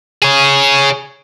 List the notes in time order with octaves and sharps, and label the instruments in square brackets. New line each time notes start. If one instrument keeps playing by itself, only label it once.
[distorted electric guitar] G#4 C#5